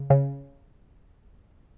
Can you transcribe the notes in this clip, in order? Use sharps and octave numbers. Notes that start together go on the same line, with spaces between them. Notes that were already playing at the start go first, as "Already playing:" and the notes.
Already playing: C#3
C#3